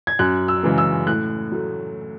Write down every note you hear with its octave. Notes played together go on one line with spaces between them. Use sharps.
G#6
F#2 F#6
E6
C#3 E3 G#3
E6
A2 F#6
F#3 A3